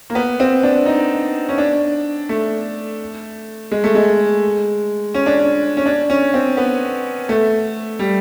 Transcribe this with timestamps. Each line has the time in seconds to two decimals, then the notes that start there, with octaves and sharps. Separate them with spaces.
0.10 A#3
0.15 B3
0.40 C4
0.63 D4
0.86 D#4
1.49 C#4
1.58 D4
2.29 A3
3.72 G#3
3.84 A3
3.95 G#3
5.14 C#4
5.26 D4
5.39 C#4
5.77 C#4
5.86 D4
6.10 C#4
6.34 C4
6.57 B3
7.29 A3
7.99 G3